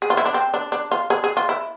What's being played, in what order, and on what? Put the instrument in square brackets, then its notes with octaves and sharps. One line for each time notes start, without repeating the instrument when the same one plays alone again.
[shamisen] G#4
F4
E4
D4
C4
D4
D4
F4
G#4
G#4
F4
E4